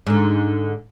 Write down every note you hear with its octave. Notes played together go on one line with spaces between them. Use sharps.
G#2 D3